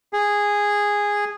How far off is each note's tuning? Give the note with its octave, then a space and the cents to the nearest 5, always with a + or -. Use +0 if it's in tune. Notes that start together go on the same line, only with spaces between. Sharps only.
G#4 -10